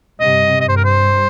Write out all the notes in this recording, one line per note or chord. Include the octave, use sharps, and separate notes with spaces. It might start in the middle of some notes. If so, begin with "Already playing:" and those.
G2 C3 D#5
G2 D#5
C5
A#4
C5